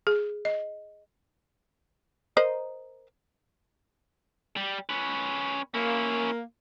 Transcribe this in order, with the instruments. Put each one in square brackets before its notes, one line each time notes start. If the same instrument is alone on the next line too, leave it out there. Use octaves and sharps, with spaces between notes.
[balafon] G#4
D#5
[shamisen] A#4 C5 D#5
[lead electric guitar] G3
C#4 B4
[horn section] A#3 [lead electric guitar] C#4 E4